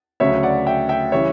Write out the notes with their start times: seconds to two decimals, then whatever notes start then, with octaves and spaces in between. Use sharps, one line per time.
0.20 D2 C#3 F#3 C#5 E5
0.43 D5 F#5
0.67 E5 G5
0.89 E5 G5
1.12 C#3 E3 G3 C#5 E5